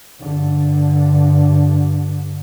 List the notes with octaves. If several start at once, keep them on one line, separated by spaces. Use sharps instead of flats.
G2 D3